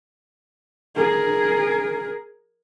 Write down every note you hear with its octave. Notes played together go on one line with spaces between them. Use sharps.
G#4 A#4